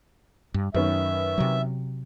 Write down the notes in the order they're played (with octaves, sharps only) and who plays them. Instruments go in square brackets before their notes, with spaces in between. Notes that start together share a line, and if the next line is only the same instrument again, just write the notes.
[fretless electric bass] G2
[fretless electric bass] F#2 [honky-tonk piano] D#3 B3 C#4 [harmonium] E5
[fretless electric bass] C3 F#3